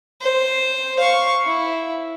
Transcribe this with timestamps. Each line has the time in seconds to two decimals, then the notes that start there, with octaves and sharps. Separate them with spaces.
0.21 C5
0.99 F5 C#6
1.45 E4